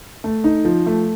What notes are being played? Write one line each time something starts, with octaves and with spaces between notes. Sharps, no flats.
A3
D#4
F3
A3